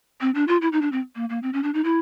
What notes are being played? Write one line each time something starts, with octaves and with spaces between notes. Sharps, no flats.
C4
D4
F4
E4
D#4
D4
C4
A#3
A#3
C4
C#4
D4
D#4
E4